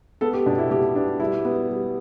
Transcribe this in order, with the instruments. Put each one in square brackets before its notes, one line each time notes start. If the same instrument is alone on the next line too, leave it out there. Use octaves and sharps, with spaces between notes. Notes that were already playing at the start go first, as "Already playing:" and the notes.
[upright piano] B3 A4
G4
B2 D4
E4
B2 G4
B3 D4
G3 E4
B3
G3